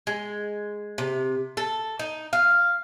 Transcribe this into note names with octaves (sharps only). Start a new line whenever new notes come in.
G#3
C3
A4
D#4
F5